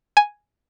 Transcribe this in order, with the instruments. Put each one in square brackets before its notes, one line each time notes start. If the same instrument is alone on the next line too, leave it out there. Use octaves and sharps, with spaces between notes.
[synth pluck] G#5